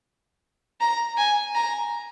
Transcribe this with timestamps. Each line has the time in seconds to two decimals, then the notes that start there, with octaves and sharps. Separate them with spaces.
0.81 A#5
1.18 G#5
1.55 A#5